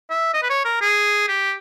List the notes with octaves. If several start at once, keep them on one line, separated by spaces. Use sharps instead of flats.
E5
D#5
B4
C#5
A#4
G#4
G4